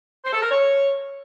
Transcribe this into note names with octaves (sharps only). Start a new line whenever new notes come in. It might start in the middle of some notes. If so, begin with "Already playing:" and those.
C5
A4
A#4
C#5